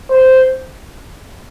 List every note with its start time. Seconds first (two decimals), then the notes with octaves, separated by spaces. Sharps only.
0.11 C5